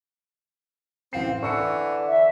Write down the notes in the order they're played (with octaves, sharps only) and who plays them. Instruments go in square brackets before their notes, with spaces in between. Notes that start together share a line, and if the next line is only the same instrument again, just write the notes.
[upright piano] A1 F5 C7 [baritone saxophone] C4
[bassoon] D3 [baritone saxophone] E3 [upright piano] C#6 E6 C#7
[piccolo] E5